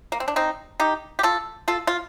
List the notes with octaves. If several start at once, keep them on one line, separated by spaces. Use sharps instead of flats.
A#3
C4
D4
C4 D#4
D#4 G4
G4
F4 A4
F4 A4
F4